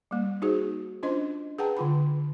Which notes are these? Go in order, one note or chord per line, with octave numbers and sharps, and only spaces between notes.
G3 A#3
D#4 F#4 G#4 C5
C#4 D4 F4 C5 D#5 C6
G#4 B4 F#5 G5 A5 A#5
D3 F4 B5